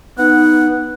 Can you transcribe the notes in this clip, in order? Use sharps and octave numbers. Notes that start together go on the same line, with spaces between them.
B3 D#4 F#5